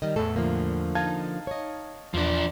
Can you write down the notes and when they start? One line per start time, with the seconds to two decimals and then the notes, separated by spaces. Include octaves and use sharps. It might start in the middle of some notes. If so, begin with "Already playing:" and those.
0.02 D#3 G3 D#5 F6
0.16 E2 A2 A3 A4
0.36 D3 F3 A#3
0.95 D#4 F5 A5 G#6
1.47 C#5 D#5
2.14 E2 E3 F3 D4 D6